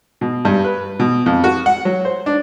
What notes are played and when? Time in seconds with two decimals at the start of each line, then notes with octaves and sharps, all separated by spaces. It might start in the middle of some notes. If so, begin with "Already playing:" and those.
0.21 B2
0.45 G2
0.64 B4
1.00 B2
1.26 F2
1.44 F#4
1.66 F#5
1.85 F#3
2.05 C5
2.26 D4